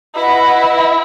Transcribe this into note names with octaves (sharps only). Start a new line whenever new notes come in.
E4 B4 D#5 F#5 B5